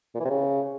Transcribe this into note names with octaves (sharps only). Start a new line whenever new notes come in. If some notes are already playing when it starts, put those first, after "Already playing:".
A#2
E3
C3
C#3